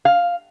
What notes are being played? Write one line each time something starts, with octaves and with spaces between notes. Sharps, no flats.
F5